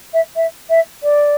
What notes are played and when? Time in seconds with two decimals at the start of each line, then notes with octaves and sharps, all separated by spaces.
0.13 E5
0.36 E5
0.69 E5
1.03 D5